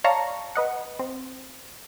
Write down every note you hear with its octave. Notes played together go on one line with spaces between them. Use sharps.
C#5 D5 F5 A5 A#5 C#6
B4 D#5 F#5
C4